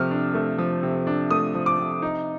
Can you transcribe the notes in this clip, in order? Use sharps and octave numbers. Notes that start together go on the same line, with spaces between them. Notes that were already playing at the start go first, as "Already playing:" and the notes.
Already playing: C3 F3 A3 F6
D4
A3
F3
C3
D4
A3 D#6
F3
D6
C3
D#4